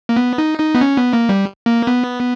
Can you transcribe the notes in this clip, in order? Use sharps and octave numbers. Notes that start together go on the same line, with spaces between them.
A#3
B3
D#4
D#4
B3
C#4
B3
A#3
G3
A#3
B3